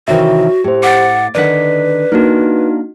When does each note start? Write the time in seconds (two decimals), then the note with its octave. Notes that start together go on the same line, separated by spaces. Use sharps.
0.08 C3 D#3 E3 F#4 C#5 E5
0.64 A2 G4 C5
0.83 F#5 D6 A6
1.35 D3 D#3 B4 D5 F#5 B6
2.12 A#3 D4 D#4 F#4